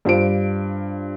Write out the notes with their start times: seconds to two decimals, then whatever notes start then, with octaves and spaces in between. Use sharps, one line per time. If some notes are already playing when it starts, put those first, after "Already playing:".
0.05 G2 F4 C5 D7